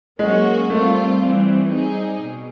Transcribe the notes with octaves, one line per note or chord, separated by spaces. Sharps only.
F#3 G#3 A#3 C#4 F#4
G3 A3 C4 F4
E3 G3 C4
G3 C4 D#4 G#4
B2